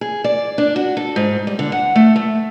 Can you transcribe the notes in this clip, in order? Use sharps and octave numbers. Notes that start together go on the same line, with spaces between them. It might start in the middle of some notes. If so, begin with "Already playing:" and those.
G#4
D5
D4
F#4
A4
G#2
G3
D3
F#5
A3
A3